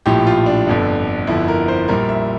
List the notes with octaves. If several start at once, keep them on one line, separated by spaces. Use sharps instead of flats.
A#1 A2 F3 G4
F4
D4
G1 F2 D3
G1 F2 D3 F3 E4
A#4
C5
A#1 A#2 G3 A#4
E5